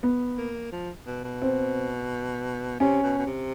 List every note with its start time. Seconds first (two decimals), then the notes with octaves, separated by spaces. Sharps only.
0.03 B3
0.38 A#3
0.72 F3
1.06 B2
1.24 B2
1.42 C4
2.80 C3 C#4
3.03 B2
3.18 B2
3.27 C3